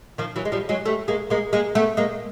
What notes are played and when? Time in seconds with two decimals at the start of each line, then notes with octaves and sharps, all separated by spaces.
0.18 D#3 F3
0.36 E3 F#3
0.45 G#3
0.52 F3 G3
0.69 F#3 G#3
0.85 G3 A3
1.08 G#3 A#3
1.30 G#3 A#3
1.53 G#3 A#3
1.75 A3 B3
1.97 G#3 A#3